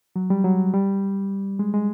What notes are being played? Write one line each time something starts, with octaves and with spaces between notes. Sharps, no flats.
F#3
G3
F#3
G3
G#3
G#3